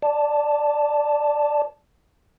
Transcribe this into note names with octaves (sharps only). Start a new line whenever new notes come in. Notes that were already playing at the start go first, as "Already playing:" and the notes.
D5 A5